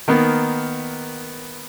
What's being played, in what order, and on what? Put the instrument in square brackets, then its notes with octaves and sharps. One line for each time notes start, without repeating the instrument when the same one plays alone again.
[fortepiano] D#3 A#3 B3